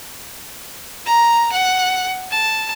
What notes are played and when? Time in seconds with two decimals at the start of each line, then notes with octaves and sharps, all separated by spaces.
1.06 A#5
1.52 F#5
2.31 A5